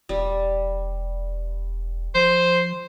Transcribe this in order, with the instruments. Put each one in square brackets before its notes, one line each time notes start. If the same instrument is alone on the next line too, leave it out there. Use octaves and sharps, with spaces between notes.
[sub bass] E1 [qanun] G3
[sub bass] F3 [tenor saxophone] C5